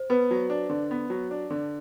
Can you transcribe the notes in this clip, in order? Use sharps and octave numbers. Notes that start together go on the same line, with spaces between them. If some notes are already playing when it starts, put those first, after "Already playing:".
Already playing: C5
B3 B4
F#3
D4
D3
B3
F#3
D4
D3